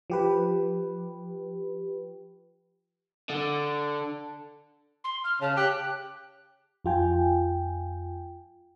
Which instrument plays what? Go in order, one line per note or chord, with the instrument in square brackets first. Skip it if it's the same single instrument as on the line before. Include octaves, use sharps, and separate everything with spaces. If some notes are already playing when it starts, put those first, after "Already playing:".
[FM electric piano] F3 G4 B4
[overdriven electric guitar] D3
[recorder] C6
F6
[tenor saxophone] C#3 [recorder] A5
[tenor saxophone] G4 [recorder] F#6
[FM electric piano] F2 F4 G5 G#5